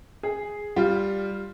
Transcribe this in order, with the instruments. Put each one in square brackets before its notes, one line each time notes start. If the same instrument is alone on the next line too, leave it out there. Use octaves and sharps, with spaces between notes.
[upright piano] G#4
[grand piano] G3 [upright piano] F4